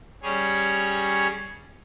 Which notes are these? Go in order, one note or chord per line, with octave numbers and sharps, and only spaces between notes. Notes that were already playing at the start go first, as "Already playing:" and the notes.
G3 C#4 G#4 C#5